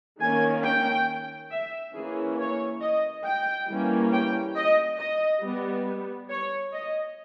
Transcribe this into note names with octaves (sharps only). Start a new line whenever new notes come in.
D#3 A#3 C#4 G#5
G5
E5
E3 A#3 C#4 G#4
C#5
D#5
G5
E3 G3 A#3 C#4
G5
D#5
D#5
G3 B3
C#5
D#5